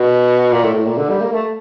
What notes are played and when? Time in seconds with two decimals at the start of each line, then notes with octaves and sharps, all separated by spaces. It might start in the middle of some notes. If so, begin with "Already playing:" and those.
Already playing: B2
0.52 A#2
0.64 A2
0.75 A2
0.87 A#2
0.98 D3
1.10 G3
1.21 A#3
1.32 A3